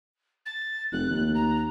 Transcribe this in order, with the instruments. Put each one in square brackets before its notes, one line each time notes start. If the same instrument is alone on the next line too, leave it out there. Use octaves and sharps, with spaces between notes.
[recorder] A6
[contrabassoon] F1 [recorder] F#6
[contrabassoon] D#2
[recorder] A#5